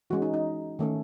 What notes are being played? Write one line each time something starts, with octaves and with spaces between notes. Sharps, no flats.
E3 G#3 C#4 F#4
D#4
D#4
D#3 A3 C#4